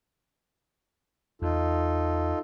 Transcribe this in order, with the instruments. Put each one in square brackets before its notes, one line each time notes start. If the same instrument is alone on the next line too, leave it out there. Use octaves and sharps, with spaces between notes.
[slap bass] E2 [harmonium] D#4 F4 A4